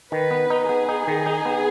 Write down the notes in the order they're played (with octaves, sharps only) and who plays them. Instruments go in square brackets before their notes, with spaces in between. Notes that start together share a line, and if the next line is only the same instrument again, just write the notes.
[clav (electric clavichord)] D#3 [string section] B4
[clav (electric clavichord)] B3
D#4
[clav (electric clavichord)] B3 [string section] G#4
[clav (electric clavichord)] D#4
D#3
D#4
B3